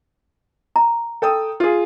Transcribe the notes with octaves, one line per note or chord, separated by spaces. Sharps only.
A#5
A4 G5 D#6
F4 G#4